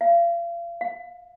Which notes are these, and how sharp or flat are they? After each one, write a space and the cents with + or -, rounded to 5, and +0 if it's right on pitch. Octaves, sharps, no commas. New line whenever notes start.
F5 -35
F5 +30